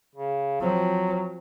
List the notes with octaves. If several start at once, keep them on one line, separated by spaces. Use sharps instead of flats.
C#3
F3 F#3 C4